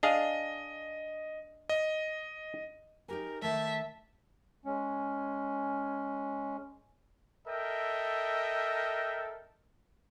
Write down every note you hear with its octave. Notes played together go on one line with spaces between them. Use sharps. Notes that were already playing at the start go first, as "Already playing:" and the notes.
D4 G#4 D#5 F5
D#5
D#4 G4 A#4 G#5
D#3 A3 E5 A5
G#3 C#4
A4 A#4 D#5 E5 G5